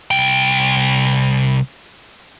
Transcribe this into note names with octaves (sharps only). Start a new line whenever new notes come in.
C2 G5